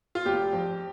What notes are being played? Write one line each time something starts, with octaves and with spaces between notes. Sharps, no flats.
F4
F1 G4
F2